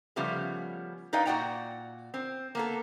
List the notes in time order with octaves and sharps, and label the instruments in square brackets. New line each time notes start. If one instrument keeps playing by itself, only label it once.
[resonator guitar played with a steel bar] C#3 F3 G3 A3 B3 C#4
D#4 B4 D5 D#5 F5 G5
A#2 F#4 D5 F#5 G5 A#5
C4
A#3 B3 A4